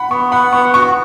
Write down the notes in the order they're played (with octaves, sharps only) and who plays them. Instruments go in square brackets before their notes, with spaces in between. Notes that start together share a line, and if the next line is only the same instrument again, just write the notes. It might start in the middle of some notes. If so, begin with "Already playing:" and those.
Already playing: [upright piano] F#5 B5
[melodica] B3 [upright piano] C#6
[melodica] F#5 [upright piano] B5
[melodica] B3 [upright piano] C#6
[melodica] F#4 [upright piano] C#6